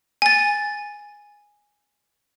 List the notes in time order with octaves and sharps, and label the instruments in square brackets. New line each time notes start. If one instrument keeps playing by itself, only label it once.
[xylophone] G#5 A6